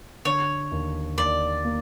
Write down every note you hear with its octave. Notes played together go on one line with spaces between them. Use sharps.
D3 C#5
D#2
D#2 D5
A#3